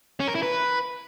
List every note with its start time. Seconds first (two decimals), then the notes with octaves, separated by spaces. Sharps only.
0.20 C#4
0.28 A#4
0.35 E4
0.43 B4